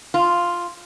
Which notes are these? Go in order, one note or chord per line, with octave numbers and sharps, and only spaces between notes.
F4